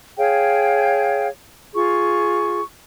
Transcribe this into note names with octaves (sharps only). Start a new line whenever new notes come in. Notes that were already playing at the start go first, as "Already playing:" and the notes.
G#4 C#5 F5 G5
F4 G#4 C#6